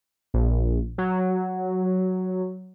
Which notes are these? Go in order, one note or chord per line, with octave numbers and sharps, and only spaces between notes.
A#1
F#3